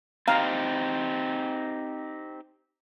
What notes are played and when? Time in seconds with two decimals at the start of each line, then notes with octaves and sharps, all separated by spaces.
0.28 C4 D#4 G4 F5 A#5